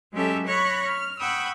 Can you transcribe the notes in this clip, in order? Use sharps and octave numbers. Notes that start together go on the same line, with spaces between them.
F#3 G#3 C#4 G4 A4 E5
C#5 B5 C#6 F#6 A#6
F6
F#5 G5 B5 C#6 D#6 E6